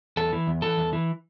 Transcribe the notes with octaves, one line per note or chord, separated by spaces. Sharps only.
E2 A4
E3
E2
E3 A4
E2
E3